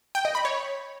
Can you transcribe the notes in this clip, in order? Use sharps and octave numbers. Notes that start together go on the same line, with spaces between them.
G5
D#5
B5
C#5